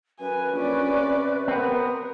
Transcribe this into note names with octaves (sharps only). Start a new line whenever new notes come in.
F#2 B4 G#5
A#1 C#4 D5
C3
B3 C4 A#4